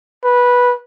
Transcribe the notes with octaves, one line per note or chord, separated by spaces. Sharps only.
B4